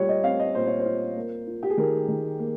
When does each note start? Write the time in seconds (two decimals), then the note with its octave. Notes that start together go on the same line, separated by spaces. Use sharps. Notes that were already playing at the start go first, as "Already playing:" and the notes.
Already playing: A#2 G3 F4 C#5
0.09 D#5
0.23 C4 F5
0.40 D#5
0.55 A#2 C5
0.66 C#5
0.79 C5
0.85 F4
1.16 A#3
1.47 F4
1.63 G4
1.70 G#4
1.78 D#3 A#4
2.08 D#3
2.39 A#3